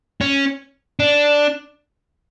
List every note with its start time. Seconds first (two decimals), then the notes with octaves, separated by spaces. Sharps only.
0.21 C#4
0.99 D4